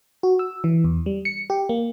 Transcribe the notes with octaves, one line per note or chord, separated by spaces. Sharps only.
F#4
E6
E3
E2
G3
C#7
G4
A#3